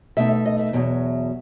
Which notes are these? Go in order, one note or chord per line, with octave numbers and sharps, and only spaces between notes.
B2 A3 D#4 E5
E5
D#5
E5
E2 B2 F#3